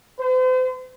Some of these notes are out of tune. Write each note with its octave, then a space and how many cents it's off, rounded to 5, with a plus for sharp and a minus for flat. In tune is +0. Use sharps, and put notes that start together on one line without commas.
C5 -40